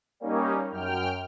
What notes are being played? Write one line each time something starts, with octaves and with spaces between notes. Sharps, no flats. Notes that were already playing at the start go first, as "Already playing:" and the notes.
G3 A#3 C#4 D#4
F#2 G5 F6